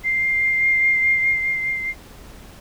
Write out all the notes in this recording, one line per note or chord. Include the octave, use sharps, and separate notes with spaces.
C7